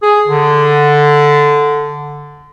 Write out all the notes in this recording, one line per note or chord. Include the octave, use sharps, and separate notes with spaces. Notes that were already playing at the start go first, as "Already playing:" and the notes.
G#4
D3